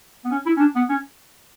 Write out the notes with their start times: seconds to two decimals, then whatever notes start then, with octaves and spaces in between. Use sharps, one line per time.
0.25 B3
0.31 C#4
0.46 E4
0.56 C#4
0.60 D4
0.75 B3
0.89 C#4